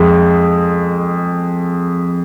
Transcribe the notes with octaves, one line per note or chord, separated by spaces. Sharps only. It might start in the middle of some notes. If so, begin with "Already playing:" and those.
Already playing: F2 G#3